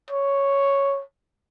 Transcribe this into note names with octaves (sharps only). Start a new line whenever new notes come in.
C#5